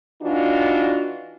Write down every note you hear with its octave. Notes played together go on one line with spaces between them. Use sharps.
E3 D4 D#4 F4 F#4